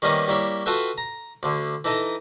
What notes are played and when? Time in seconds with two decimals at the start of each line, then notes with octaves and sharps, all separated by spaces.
0.02 D#3 G3 A#3 B3 C#4 D#4
0.28 G3 A#3 E4 C#5
0.66 F4 F#4 A4 B4 E5 G5
0.98 A#5
1.43 D2 D3
1.85 E3 D#4 A4 A#5 D#6